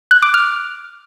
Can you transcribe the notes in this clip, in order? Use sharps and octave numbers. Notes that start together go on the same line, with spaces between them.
F#6
D6
F6